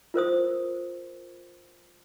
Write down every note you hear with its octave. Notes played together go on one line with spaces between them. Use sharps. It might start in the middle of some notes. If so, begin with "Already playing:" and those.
F4 A#4 C5 D#6